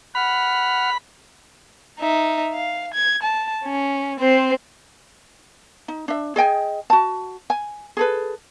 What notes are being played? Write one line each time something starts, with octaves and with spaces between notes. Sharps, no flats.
F#5 B5 F6
D#4 E5
F5
G#6
A5
C#4
C4 C5
D#4
D4 E5
G#4 D#5 G5 G#5
F#4 A5
G#5
G#4 A4 B4